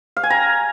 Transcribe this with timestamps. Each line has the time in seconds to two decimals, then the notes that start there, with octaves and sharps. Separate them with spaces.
0.17 F5
0.23 G#5
0.30 A#5